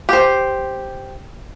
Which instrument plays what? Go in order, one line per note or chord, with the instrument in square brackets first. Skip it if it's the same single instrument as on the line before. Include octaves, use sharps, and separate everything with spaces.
[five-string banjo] G4 C5